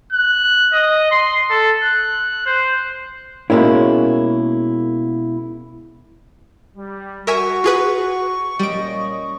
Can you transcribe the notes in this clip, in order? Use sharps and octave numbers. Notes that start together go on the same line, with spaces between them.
F#6
D#5
C6
A4
F#6
C5
B2 G#3 A#3 C#4 E4
G3
F#4 A#4 E5 G#5 C#6
F4 G#4 B4
A#2 G3 C#4 D#5 D7